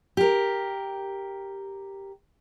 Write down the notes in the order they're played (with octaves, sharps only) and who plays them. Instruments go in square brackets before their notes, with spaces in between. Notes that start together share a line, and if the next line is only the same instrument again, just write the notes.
[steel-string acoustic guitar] G4 A#4